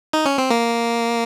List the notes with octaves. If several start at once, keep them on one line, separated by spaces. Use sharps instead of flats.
D#4
C#4
C4
A#3